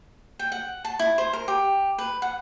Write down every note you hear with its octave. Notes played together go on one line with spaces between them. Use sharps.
G5
F#5
A5
E4
C5
A#4
G4
B4
F#5